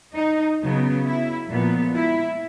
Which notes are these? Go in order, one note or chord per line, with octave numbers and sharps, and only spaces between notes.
D#4
C#3 F#3 B3
E4
A#2 F3 G#3 B3
E4